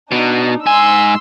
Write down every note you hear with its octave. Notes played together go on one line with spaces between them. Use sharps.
B2 D4 D#4
G#2 G#5 C6 E6